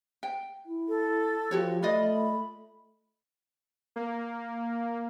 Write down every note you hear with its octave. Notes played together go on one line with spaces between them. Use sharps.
G5
E4
A4
F3 F#4 G4 C#5
A3 F4 D5 D#5 B5
A#3